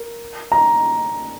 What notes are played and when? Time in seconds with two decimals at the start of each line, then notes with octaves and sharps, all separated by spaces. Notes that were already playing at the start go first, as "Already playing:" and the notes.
Already playing: A#4
0.52 A#5